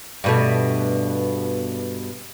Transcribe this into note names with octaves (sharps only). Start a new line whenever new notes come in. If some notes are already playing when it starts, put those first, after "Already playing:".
G2 B2 A3